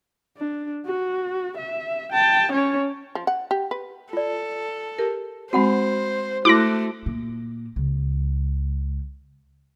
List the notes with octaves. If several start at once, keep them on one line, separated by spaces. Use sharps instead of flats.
D4
F#4
E5
G5 A5
C#4 C#5
F3
F#5
G4
B4
F4 A4 D5
G4 A#4
G#3 C4 F#4 C5 F#5 B5
A3 E4 F#4 C6 D6 F#6 A#6
A#2
C#2